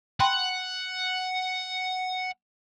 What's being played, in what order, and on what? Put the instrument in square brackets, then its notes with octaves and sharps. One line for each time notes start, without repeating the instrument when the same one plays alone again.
[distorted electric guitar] F#5 [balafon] G5 B5 C6